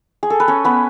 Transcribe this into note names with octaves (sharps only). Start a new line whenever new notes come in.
G#4
A4
B4
C#4 C#5
B3 B4